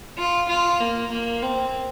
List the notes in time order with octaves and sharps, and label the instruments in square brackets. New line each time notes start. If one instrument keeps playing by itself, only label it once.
[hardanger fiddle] F4
F4
A#3
A#3
C4